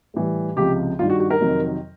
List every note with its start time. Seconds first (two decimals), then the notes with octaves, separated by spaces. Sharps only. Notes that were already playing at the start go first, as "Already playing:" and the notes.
0.14 A2 E3 G3
0.56 C#2 C3 F3 G4
0.99 G2 D#3 G3 F4
1.10 F#4
1.20 F#4
1.31 A#4
1.41 F2 C3 D#3 F#3